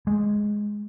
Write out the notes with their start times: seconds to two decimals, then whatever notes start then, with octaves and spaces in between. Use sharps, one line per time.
0.07 G#3